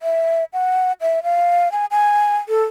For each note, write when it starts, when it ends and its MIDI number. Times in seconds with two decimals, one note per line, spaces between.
0.02 0.44 76
0.53 0.92 78
1.01 1.23 76
1.23 1.71 77
1.72 1.86 80
1.91 2.37 80
2.49 2.63 69